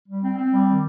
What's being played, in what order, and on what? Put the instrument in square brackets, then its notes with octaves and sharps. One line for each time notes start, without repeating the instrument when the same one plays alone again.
[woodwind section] G3
C4
C4
G3
D#3